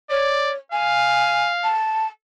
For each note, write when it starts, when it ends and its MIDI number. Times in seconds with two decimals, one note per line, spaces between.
0.10 0.56 73
0.10 0.53 74
0.72 1.74 77
0.72 1.48 80
1.64 2.07 81